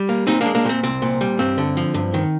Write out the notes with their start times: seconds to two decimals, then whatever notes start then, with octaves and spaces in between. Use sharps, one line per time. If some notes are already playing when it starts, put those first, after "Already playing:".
Already playing: G3
0.09 A#3
0.27 A#2 C4 D#4
0.41 A#3 D4
0.46 G#3
0.55 A#3 D4
0.65 A#2 C4
0.83 C2 C4
1.02 A#2
1.21 G3
1.39 G2 C4
1.58 D3
1.77 F3
1.94 G2
2.14 D#3